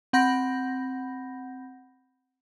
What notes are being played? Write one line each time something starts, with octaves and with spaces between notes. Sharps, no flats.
C4 F#5 B5 G6 A#6